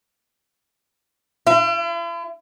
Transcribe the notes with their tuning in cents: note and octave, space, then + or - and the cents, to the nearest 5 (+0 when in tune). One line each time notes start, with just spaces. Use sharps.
E4 +45